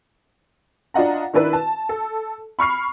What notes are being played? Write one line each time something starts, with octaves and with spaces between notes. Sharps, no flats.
D4 F4 D#5 F#5 A#5
D#3 D4 E4 B4
A5
A4
B5 C#6 F6 C7